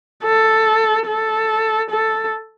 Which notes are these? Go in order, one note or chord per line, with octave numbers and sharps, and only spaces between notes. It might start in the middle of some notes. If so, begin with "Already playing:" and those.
A4
A4
A4